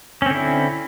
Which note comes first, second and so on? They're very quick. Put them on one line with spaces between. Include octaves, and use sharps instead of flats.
C#4 C4 D3 E4